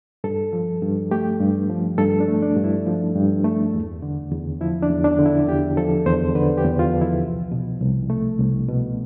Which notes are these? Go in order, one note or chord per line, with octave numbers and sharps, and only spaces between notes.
G2 A4
F3
G2
A3 G4
G2
F3
G2 A4
D4
A3
D4
G2
E4
F3
G2
A3
E2
D3
E2
F3 E4
D4
E2
D4
D3
E4
E2 G4
F3 A4
E2 C5
D3 B4
G4
E2
F4
F3
E4
C2
B2
C2
A3
C2
B2